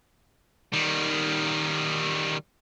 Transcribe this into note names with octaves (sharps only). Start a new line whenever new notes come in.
D#3 G3